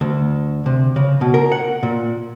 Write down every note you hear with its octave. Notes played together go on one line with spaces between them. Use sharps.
D2
C3
C#3
B2
A#4
F#5
A#2